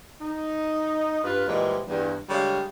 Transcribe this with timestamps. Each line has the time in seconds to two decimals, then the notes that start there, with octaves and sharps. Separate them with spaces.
0.21 D#4
1.24 G2 F4 B4
1.47 A#2 E3 F3 G3 G#3
1.88 E2 G2
2.30 D3 G3 G#3 G#4 C#5 F5